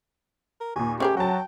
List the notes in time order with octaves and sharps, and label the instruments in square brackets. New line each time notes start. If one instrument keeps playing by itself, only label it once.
[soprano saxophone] A#4
[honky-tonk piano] D#2 A#2 [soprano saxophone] G#5
[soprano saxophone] A3 [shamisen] C#4 G#4 A#4 [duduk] G4 [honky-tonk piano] C5
[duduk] F#3 [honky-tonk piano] F#4 A5 [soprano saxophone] G5